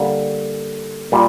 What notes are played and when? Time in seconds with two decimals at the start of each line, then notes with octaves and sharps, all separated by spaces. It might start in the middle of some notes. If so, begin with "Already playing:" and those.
Already playing: D3 G3 A#3
1.12 A#2 G3